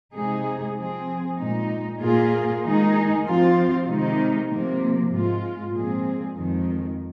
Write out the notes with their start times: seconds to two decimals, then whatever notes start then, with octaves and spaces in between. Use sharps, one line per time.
0.15 C3 G#3 D#4 G#4
0.77 F3 C4 G#4
1.39 A#2 G#3 D#4
2.01 A#2 A#3 F4 G#4
2.63 D#3 G#3 D#4 G#4
3.26 F3 C4 F4
3.87 C3 D#3 G#3 D#4
4.49 C3 F3 A#3
5.11 G#2 G#3 F4
5.73 A#2 F3 G#3 C4 G#4
6.35 F2 D#3 G#3